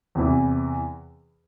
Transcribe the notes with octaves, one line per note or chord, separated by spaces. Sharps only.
E2 C3 E3